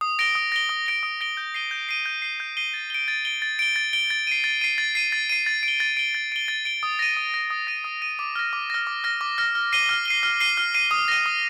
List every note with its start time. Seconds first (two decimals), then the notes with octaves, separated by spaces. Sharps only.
0.01 D#6
0.19 A#6 D7 G7
0.35 D#6
0.52 A#6 D7 G7
0.69 D#6
0.86 A#6 D7 G7
1.03 D#6
1.21 A#6 D7 G7
1.37 G6
1.54 C7 D#7 G7
1.71 G6
1.89 C7 D#7 G7
2.06 G6
2.22 C7 D#7 G7
2.40 G6
2.57 C7 D#7 G7
2.74 A6
2.90 D7 G7
3.08 A6
3.25 D7 G7
3.42 A6
3.59 D7 G7
3.76 A6
3.93 D7 G7
4.10 A6
4.27 C7 D#7
4.44 A6
4.61 C7 D#7
4.78 A6
4.95 C7 D#7
5.12 A6
5.30 C7 D#7
5.46 A6
5.63 D7
5.68 G7
5.80 A6
5.97 D7 G7
6.15 A6
6.32 D7 G7
6.48 A6
6.65 D7 G7
6.83 D#6
6.99 A#6 D#7
7.17 D#6
7.34 A#6 D#7
7.50 D#6
7.67 A#6 D#7
7.84 D#6
8.02 A#6 D#7
8.19 D6
8.36 F6 A#6
8.53 D6
8.70 F6 A#6
8.87 D6
9.04 F6 A#6
9.21 D6
9.38 F6 A#6
9.55 F6
9.72 C7 D#7 G7
9.89 F6
10.06 C7 D#7 G7
10.23 F6
10.40 C7 D#7 G7
10.57 F6
10.74 C7 D#7 G7
10.91 D#6
11.08 A#6 D#7
11.26 D#6